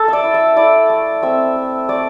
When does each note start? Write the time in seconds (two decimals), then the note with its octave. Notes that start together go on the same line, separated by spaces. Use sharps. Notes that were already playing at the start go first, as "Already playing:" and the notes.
Already playing: A4
0.08 D5 E5
0.24 E4
0.34 E5
0.56 E4 D5
0.90 A3
1.23 C4 E5
1.56 A3
1.89 A3 D5